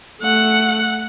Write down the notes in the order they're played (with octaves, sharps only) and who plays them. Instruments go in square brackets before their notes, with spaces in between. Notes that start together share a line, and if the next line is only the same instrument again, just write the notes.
[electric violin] A3 F#5